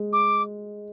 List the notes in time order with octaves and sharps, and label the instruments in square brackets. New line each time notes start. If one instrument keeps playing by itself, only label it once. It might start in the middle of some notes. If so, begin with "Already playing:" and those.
Already playing: [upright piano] G#3
[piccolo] D6